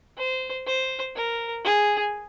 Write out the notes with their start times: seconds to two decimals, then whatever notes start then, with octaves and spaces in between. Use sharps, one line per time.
0.17 C5
0.66 C5
1.16 A#4
1.64 G#4